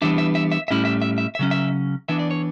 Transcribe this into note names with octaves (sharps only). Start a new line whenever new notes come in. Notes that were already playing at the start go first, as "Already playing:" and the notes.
E3 G3 B3 D4 E5
E5
E5
E5
A2 G3 C#4 E4 E5
E5
E5
E5
E5
C#3 F#3 C#4
E5
E3 B3 D4 E5
D5
C#5